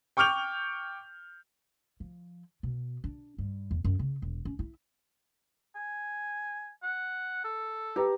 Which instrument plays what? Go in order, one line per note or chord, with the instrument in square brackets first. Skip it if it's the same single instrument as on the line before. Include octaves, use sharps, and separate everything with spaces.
[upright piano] G5 C#6 D6 F6 G6 F7
[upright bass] F3
B2
D4
G2
E2
F#2
C#3
E1
C#4
E4
[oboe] G#5
F#5
A4
[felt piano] G4 B4 A#5